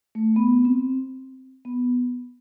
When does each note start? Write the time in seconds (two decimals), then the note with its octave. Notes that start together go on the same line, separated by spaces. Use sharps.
0.15 A3
0.36 B3
0.65 C4
1.65 B3